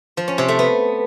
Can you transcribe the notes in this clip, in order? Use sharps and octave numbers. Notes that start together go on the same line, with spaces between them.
F3
C#4
C3
A3
B3